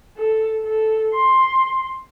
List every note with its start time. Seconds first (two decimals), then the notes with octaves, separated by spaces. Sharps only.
0.17 A4
0.64 A4
1.14 C6